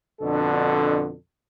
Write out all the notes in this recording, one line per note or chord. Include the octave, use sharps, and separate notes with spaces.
F2 B2 D3 D4 A4